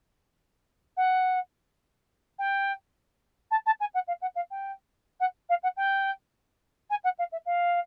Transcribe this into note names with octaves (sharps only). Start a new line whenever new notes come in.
F#5
G5
A5
A5
G#5
F#5
F5
F#5
F5
G5
F#5
F5
F#5
G5
G#5
F#5
F5
E5
F5